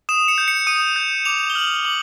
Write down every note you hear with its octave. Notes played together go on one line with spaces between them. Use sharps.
D#6 E7
C#7
G6
C#7
D#6 D#7
G6
D6 F7
G7
F6 F#7
D6 F#7